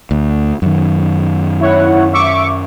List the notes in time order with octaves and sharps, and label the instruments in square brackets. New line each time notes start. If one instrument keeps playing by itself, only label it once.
[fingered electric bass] D2
F#2 D#3
[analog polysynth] E4 C#5 F#5
E5 C#6 D6